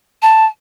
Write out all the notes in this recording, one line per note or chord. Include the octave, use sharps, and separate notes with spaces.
A5